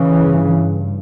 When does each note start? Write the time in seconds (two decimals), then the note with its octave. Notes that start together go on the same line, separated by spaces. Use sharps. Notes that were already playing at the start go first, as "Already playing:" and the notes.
Already playing: C#3 E3
0.16 G2